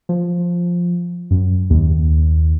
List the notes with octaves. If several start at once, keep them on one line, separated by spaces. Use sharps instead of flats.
F3
F#2
D#2